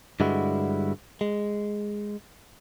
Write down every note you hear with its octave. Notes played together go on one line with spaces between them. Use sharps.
G2 D3 G3 G#3 E4 F#4
G#3